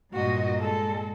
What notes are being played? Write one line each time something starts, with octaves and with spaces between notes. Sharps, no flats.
G2 A#2 F#4 D#5
G#3 A4